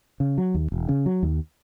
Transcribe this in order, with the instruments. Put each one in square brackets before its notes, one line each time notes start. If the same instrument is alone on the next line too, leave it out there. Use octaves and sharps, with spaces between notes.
[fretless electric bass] C#3
F#3
D#2
E1
C#3
F#3
D#2